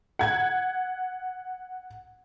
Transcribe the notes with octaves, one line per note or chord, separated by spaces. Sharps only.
F#5 G#6